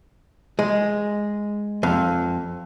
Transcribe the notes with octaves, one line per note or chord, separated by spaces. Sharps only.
G#3
F2